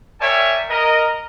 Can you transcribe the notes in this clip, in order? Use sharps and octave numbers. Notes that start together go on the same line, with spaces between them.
A#4 C#5 D5 E5 G5 G#5
A#4 D#5